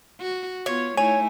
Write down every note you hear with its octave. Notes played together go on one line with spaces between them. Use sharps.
F#4
B3 F4 C#5
A3 D#4 E4 C#5 G#5